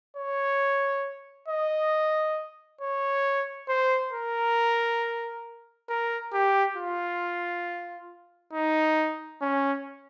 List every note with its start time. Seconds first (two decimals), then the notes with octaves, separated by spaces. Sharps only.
0.17 C#5
1.48 D#5
2.81 C#5
3.69 C5
4.13 A#4
5.89 A#4
6.33 G4
6.77 F4
8.53 D#4
9.42 C#4